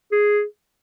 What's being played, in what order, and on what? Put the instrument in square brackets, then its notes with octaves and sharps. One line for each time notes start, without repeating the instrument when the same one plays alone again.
[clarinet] G#4